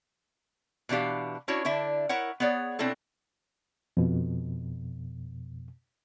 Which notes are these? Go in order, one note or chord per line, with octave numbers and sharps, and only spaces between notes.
B2 E3 D4 G4 F5
C#4 D4 E4 F#4 C#5
D3 D4 E4 E5
E4 A#4 C#5 F#5
B3 G#4 C#5 D5
B2 C4 D4 E4 A4 C#5
F2 B2